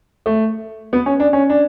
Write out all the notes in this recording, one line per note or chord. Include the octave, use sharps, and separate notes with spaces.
A3
B3
C#4
D4
C#4
D4